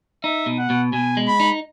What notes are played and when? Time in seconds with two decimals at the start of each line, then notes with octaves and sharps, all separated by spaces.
0.24 D#4 E5
0.46 B2
0.58 F#5
0.70 B2
0.93 B2 G#5
1.17 G#3
1.27 B5
1.40 D#4